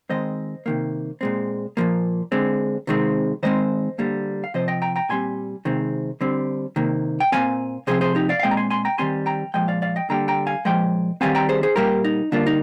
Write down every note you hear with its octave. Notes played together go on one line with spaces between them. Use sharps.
D#3 G#3 C4 C5 D#5
C3 D#3 A#3
A#2 G#3 C4
A#2 F3 A#3
D3 G#3 C4
C3 D#3 G#3 C4
D#3 G#3 C4 C5 D#5
D3 G3 A#3
F5
C3 F3 C4 C5 D#5
D#5 G5
G5 A#5
G5 A#5
A#2 G3 C4 G#5 C6
C3 D#3 G#3 C4
D3 G3 C4
C3 D#3 A#3
G5
A#2 G#3 C4 F5 G#5
C3 F3 C4 G#4 C5
G#4 C5
D#4 G4
D5 F5
F5
A#2 G#3 C4 D#5 G5
A#5
G#5 C6
G#5 C6
G5 A#5
D#3 G3 C4 G#5 C6
G5 A#5
A#2 F3 G#3 D#5 G5
D5 F5
D5 F5
D#5 G5
D3 G3 A#3 G5 A#5
G5 A#5
F5 G#5
A#2 F3 G#3 D#5 G5
D#3 G3 C4 F5 G#5
G5 A#5
G#4 C5
G#4 C5
A#2 G3 A#3 G4 A#4
D#4
D3 G3 A#3 D4 F4
D#4